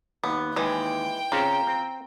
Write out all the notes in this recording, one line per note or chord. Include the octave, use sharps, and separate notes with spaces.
D#2 B3
D#2 E3 G#3 G5
C#3 C4 C#4 F4 A#5
C4